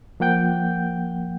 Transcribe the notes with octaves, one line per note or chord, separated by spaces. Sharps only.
F3 A#3 F#5 G5 G6